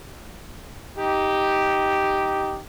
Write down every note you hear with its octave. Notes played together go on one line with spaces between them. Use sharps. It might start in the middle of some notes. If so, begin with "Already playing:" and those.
D#4 G4